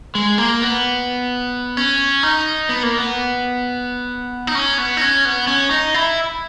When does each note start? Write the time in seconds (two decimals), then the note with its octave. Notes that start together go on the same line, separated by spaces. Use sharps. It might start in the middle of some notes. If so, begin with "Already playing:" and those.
0.15 G#3
0.38 A#3
0.61 B3
1.77 C#4
2.23 D#4
2.69 B3
2.83 A#3
2.98 B3
4.47 D#4
4.55 C#4
4.78 B3
4.97 D#4
5.01 C#4
5.25 B3
5.47 C#4
5.71 D#4
5.94 E4